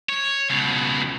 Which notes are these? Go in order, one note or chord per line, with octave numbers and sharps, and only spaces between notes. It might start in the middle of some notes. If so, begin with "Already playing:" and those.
C#5
C#2 B2